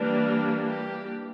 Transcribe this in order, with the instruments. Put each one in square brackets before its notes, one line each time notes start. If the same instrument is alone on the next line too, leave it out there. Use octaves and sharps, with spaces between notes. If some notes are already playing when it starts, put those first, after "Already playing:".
Already playing: [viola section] E3 G3 A#3 D4
G4